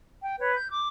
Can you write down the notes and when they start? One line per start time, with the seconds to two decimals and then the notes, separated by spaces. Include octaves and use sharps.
0.22 G5
0.39 B4 C#5
0.54 G6
0.69 D6